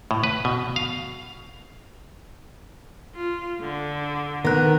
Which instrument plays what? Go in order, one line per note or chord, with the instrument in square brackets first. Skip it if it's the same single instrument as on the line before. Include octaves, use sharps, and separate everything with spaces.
[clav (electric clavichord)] A2
B4
B2
F5
[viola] F4
D3
[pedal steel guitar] D#3 F#6 [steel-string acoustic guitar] B3 A#4